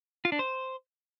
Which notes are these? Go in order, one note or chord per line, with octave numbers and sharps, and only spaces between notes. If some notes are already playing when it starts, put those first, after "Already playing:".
F4
D4
C5